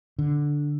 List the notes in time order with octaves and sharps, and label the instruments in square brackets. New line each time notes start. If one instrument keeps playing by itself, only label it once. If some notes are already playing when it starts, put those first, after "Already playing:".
[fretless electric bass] D3